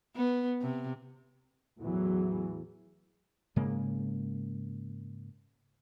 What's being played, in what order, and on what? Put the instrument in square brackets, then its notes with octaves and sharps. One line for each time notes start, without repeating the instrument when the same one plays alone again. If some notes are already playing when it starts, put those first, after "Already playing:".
[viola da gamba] B3
C3
[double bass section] E2 A2 E3 F#3
[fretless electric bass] G#2 C#3 G#3 A#3